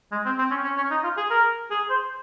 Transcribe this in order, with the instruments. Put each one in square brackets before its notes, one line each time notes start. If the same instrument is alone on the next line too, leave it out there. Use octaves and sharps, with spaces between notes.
[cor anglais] G#3
C4
C4
C#4
C#4
C#4
D#4
F4
G#4
A#4
G#4
C5